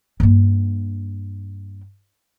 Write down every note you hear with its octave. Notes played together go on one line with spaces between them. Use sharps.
G2 A#3